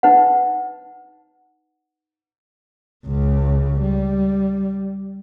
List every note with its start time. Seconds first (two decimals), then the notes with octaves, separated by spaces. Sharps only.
0.03 D#4 B4 F#5
3.07 C#2 C#3
3.82 G3